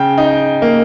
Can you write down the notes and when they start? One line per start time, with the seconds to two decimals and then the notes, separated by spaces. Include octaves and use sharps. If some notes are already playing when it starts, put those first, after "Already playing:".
Already playing: C#3 G5
0.18 D#4
0.62 A#3